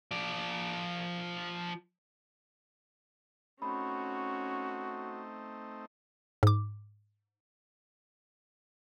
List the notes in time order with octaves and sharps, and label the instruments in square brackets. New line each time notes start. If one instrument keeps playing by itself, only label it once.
[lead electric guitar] F3 D5
[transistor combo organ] A3 C4 D#4 [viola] C#4 [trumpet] F#4 [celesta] B5
[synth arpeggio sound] G#2 D6